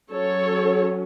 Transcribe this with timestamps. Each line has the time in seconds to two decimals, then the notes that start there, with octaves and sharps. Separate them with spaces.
0.12 F#3 C#4 A4 C#5